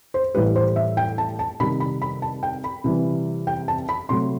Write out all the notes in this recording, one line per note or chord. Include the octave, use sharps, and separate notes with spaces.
C5
A2 E3 G3 B4
C5
E5
G5
A5
A5
C3 D#3 G3 B5
B5
B5
A5
G5
B5
C3 E3 G3
G5
A5
B5
C3 F#3 A3 C6